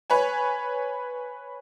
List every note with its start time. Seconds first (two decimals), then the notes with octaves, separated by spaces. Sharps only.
0.10 B4 C#5 G#5